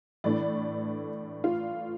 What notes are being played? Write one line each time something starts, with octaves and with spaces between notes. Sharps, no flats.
A2 E3 A3 D4 D5
F4